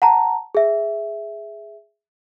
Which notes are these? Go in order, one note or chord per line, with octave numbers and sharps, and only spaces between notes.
F#5 A5 A#5
G#4 E5